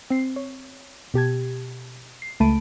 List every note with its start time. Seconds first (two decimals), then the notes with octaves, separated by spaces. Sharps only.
0.10 C4 C7
0.36 C#5
1.14 B2 G4 A5 G#6
2.22 C7
2.40 C#2 A3 A5 B5 D7 D#7